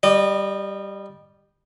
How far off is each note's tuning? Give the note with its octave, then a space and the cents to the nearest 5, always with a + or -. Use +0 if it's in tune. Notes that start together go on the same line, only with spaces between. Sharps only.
G3 +0 D#5 -30